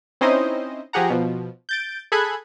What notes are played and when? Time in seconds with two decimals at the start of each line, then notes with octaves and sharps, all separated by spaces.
0.21 C4 C#4 D#4 E4 C5 D#5
0.93 F3 G4 G#4 F#5 A#5
1.10 B2 F3
1.69 G6 A6 D7
2.12 G#4 A4 B5 F#6 G#6